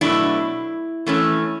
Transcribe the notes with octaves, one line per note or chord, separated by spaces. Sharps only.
B2 F#3 A3 D4 E4
E3 A3 C#4